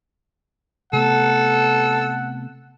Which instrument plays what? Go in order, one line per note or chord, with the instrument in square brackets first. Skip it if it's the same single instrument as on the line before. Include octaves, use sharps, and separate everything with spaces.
[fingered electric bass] C3 A3 B3 [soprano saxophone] A4 [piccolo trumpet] F#5